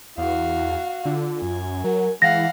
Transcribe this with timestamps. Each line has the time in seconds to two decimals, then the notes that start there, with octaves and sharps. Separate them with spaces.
0.18 E2 E4 F#4 F5
1.05 D3 F4
1.42 F#2 G#5
1.84 F#3 A#4
2.22 E3 G#3 F5 F#5 A#6